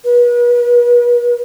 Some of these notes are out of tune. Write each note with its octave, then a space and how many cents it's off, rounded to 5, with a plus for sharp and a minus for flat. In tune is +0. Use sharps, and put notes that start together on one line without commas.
B4 -40